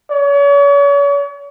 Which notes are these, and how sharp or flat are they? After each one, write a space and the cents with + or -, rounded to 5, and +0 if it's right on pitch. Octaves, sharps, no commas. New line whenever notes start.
C#5 +40